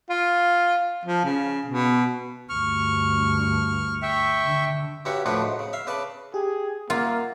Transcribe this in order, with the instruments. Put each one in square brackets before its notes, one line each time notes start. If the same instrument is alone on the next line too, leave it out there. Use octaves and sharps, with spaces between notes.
[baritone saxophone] F4
F3
C#3
B2
[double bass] D2 G2 [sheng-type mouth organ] C#6 F6
[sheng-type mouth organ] E5 G5 C#6
[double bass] D3
[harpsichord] G2 G3 C#4 F#4 E5
D2 A2 F3 D4 F#4 B4
G#2
C#3
E5 F5
C#3 B4 D5 A5
[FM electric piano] G4 [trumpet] G#4
[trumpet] A#3 [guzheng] F4 [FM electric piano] A#4 E5 F#5